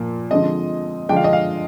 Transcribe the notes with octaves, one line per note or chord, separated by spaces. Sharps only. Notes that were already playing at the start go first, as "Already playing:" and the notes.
Already playing: A#2 F3 A#3
D3 F3 G#3 C4 D#5
D3 F3 G#3 D4 G5
F5
D#5
F5